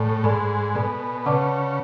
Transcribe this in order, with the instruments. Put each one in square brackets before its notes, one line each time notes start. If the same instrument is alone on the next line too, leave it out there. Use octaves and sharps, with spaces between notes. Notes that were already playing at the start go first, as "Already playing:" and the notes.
Already playing: [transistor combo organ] A2 [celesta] A4 D5 G#5 B5
[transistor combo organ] G#2 [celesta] A4 D5 G#5 B5
[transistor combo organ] B2 [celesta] A4 D5 G#5 B5
[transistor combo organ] C#3 [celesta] B4 D5 F#5 A5 D6